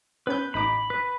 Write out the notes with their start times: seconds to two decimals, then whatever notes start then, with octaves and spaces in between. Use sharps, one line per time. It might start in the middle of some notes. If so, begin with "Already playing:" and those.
0.27 B3 C#4 B4 G6
0.54 A1 D#4 B5 D6
0.90 B4